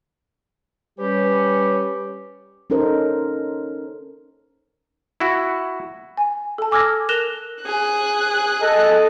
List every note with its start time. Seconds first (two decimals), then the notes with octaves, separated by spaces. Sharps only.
0.99 G3 C#4 G4 B4
2.70 C#4 D#4 A4 A#4 C5
5.20 E4 F#4
6.17 G#5
6.58 A4 A5
6.71 G#5 D6 E6 F6 G#6 A#6
7.09 A#4 F#6 A#6 E7 F7 G7
7.62 G#4 F#6
8.61 A4 D#5